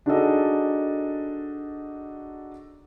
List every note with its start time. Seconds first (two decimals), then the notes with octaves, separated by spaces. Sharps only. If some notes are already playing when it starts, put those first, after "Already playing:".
0.06 D4 D#4 F#4 G#4 A4 D#5